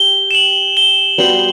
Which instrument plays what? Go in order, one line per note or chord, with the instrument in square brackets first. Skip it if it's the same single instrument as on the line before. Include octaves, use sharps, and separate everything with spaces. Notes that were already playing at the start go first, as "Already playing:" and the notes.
Already playing: [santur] G4 [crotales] G7
[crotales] E7
F#7
G7
[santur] G3 B3 F#4 C5 [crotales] F#7